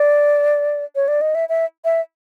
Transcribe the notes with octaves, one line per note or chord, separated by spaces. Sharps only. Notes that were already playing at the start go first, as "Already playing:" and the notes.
Already playing: D5
C#5
D5
D#5
E5
E5
E5